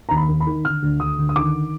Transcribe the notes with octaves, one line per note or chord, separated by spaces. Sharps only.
D#2 A#5
B5
D#2
B5
D#3
D3 F6
D2
D2 D#6
D3
D#6
D#3 D6